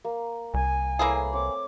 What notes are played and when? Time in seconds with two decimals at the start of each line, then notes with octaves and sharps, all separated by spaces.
0.05 A#3
0.54 C2 G#5
0.99 A3 A#3 E4 G#4 B4 C#5
1.33 C4 C#5 D6